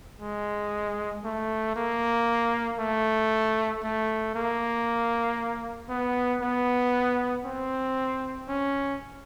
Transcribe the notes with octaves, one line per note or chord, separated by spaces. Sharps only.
G#3
A3
A#3
A3
A3
A#3
B3
B3
C4
C#4